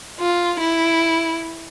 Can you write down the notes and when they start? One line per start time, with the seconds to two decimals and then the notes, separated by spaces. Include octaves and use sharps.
0.20 F4
0.61 E4